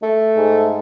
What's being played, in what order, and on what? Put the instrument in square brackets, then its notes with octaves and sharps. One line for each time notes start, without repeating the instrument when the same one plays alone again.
[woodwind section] A3
G#2